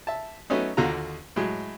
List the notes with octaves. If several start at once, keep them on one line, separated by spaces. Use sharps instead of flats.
E5 A5
F#3 A3 B3 C#4 D#4
D#2 D3 F4 F#4 A#5
A2 F#3 G#3